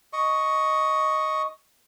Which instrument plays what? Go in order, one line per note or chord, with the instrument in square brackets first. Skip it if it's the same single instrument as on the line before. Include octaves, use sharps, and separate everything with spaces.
[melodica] D#5 C#6